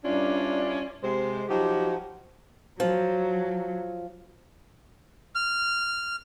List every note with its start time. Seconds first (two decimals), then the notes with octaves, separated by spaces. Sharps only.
0.04 G2 C#4 D4 E4 F4 D5
1.03 C3 G#3 C5
1.49 F3 F#3 D#4 F#4 G4
2.80 F3 F#3
5.35 F6